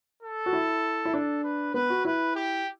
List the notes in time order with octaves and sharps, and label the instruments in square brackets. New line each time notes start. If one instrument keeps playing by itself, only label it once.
[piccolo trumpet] A4
[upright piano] F#4
E4
E4
[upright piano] D4 [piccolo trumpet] A4
[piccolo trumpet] B4
[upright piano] B3 [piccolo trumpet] B4
[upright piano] F#4
[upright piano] E4 [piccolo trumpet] B4
[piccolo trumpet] G4